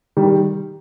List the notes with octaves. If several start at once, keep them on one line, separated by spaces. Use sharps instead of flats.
D#3 G3